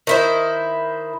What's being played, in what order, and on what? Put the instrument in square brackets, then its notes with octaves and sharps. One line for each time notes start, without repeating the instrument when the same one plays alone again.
[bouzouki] D#3 E4 C5